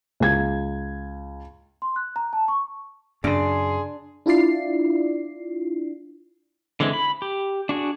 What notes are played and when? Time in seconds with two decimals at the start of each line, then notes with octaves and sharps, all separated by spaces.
0.20 C#2 G#6
1.82 C6
1.96 F#6
2.16 A#5
2.33 A5
2.48 C#6
3.24 F#2 C#3 D4 G#4 C6
4.26 D4 E4 F4 D5 C7
6.80 D3 E3 G#3 C4 E4
6.93 B5
7.22 G4
7.69 D4 F#4 G#4